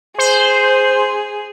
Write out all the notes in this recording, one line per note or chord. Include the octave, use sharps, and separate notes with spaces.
G#4 C5